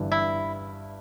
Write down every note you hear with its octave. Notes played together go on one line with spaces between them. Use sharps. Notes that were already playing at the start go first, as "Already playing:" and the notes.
Already playing: G1 G2 E3
E4